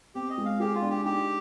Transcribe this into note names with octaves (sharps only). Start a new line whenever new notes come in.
C4 G4
D#5
G#3
F5
G4 G#4
F4
D4
G4
D#4 G4